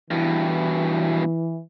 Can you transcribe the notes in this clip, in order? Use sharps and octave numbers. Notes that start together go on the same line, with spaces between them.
G2 B2 E3